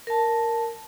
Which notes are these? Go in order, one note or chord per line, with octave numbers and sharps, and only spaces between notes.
A#4 A5